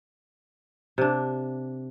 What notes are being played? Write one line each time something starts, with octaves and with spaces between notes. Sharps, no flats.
C3 D4